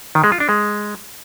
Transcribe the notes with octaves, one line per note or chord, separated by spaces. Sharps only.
D#3
G#3
F4
D4
G#3